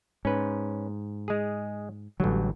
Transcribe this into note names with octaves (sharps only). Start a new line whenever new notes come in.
G#2 C#4 B4
G#3 G#4
A1 D3 F#3 G3